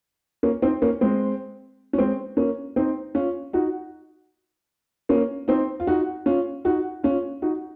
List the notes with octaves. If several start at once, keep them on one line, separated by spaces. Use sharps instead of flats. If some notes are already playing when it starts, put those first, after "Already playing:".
A#3 C#4
C4 D#4
A#3 C#4
G#3 C4
C#4
G#3 C4
A#3 C#4
C4 D#4
C#4 F4
D#4 F#4
A#3 C#4
C4 D#4
F4
D#4 F#4
C#4 F4
D#4 F#4
C#4 F4
D#4 F#4